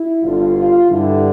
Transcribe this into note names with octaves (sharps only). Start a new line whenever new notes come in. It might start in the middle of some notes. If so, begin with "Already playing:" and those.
Already playing: E4
G1 G2 D3 F4
F4
G2 D3 G3 E4